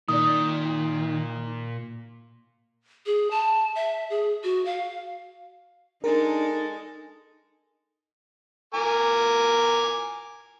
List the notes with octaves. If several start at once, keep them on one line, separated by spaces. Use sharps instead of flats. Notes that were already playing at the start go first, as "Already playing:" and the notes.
A#2 D#3 D5 D#6
G#4
A5
E5
G#4
F#4
F5
G#3 D4 D#4 A4 A#4
A#4 G#5 D6